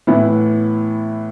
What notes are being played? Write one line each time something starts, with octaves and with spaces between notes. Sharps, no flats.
A2 E3 B3 E4